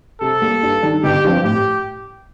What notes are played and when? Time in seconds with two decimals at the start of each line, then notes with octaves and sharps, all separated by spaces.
0.21 C3 A4
0.41 G3 A#3
0.63 G2
0.82 D#3 G3 D4
1.03 G1 G4
1.24 G2 F3 C4
1.43 A2 G4